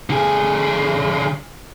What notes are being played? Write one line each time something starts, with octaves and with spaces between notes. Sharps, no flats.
D3 G#4